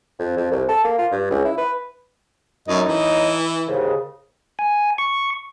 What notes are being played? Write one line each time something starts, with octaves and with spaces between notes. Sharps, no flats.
F2
F2
C2
A4
A#3
F4
G2
C#2
E4
B4
F#2 A2 D#4 D#5
E3
D#2 G#2 C#3
G#5
C#6